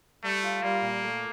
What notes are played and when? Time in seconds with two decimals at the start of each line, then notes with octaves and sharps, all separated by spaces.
0.24 G3 A3
0.43 F4
0.63 G3 A#3
0.82 A#2
1.02 A3